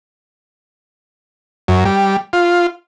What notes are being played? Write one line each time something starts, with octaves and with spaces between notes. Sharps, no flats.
F#2
G3
F4